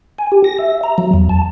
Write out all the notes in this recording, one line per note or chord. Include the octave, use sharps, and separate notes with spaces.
G#5
G4
A#6
E5
A#5
F#3
E2
A5